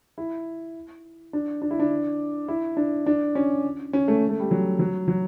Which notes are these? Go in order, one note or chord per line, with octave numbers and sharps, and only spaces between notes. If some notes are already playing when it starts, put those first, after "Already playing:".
E4
D4
D4
E4
D4
E4
D4
D4
C#4
C#4
A3
A3
G3
F#3
F#3
F#3